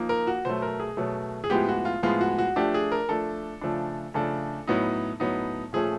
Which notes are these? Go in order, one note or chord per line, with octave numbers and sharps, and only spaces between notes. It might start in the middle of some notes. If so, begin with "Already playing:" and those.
Already playing: F3 A#3 D#4
A#4
F#4
B2 F#3 A3 C5
A#4
G#4
B2 F#3 A3
G#4
A2 F3 G#3 B3 G4
F#4
F4
A2 F3 G#3 B3 F4
F#4
F#4
F3 A3 D4 G4
G#4
A#4
F3 A3 D4 A4
C#3 F3 A3 D4
C#3 F3 A3 D4 A4
A2 F#3 B3 D#4
A2 F#3 B3 D#4
A#2 F3 A3 C#4 G#4